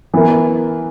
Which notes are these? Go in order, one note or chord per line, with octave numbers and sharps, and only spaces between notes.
E3 B3 E4 A#4